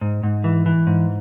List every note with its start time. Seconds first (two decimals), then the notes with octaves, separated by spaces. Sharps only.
0.01 G#2
0.23 G#2
0.44 E3
0.66 E3
0.87 G#2